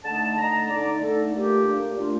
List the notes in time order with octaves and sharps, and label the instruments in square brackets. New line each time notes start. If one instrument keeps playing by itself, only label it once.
[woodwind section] D3 A3 D#4 A5
D3 A3 D#4 A#5
D3 A3 D#4 D5
D3 A3 D#4 A4
A#2 A3 D4 G4
A#2 A3 D4
A#2 A3 D4 F4